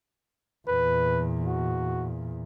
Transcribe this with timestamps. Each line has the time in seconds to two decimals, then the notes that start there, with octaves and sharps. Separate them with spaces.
0.68 E2 A#2 B4
1.47 F#4